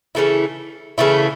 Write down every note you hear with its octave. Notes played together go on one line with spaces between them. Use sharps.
C#3 E3 A3 E4
C#3 E3 A3 E4